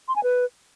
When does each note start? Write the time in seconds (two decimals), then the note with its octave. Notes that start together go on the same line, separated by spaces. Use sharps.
0.08 C6
0.16 G#5
0.23 B4